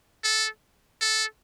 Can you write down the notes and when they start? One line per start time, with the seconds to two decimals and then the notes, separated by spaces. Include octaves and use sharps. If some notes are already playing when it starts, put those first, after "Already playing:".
0.24 A4
1.01 A4